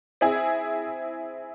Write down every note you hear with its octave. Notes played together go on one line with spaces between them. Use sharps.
C4 E4 G#4